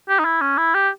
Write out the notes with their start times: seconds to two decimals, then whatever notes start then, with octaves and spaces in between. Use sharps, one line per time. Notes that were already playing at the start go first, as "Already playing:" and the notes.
0.09 G4
0.19 D#4
0.25 E4
0.41 C#4
0.58 E4
0.75 G4